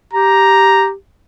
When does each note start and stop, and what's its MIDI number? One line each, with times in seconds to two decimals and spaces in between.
0.13 0.94 67
0.13 0.89 82